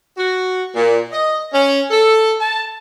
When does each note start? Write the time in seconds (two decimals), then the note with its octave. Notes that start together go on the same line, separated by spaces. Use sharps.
0.17 F#4
0.75 A#2
1.12 D#5
1.53 C#4
1.90 A4
2.40 A5